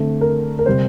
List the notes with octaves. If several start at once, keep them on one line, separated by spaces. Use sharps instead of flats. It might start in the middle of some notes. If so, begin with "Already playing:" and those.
Already playing: D3 A3 C4
A#4
A#4
C3 G3 C4 C5